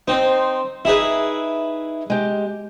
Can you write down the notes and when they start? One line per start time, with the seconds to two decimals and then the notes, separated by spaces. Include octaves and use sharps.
0.08 C4 D#4 C5
0.85 D#4 E4 G#4 B4 E5
2.10 G#3 G4